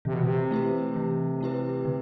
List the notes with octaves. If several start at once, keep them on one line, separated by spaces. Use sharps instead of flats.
C3 E3
B2
C3
A3 E4 G4 B4
E3
A3 E4 G4 B4
D3